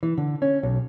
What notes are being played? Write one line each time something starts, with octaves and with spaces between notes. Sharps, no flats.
E3
D3
C#4
B1